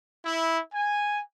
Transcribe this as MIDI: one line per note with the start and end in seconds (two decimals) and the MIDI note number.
0.25 0.59 64
0.74 1.20 80